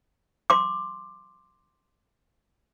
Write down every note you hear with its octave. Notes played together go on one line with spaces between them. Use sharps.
C6 D6